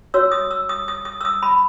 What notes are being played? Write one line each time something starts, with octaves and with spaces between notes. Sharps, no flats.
F#4 C#5 E6
D#6
E6
D#6
D#6
D#6
E6
D#6
B5